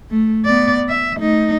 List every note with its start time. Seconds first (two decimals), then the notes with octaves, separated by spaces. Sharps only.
0.11 A3
0.45 B3 D5
0.89 E5
1.18 A3 D#4